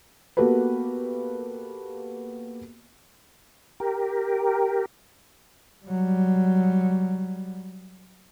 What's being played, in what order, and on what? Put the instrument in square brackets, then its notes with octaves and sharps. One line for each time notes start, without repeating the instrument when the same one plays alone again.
[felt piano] A#3 B3 F#4 G4 A4 B4
[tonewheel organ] G4 A#4
[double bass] F#3 G3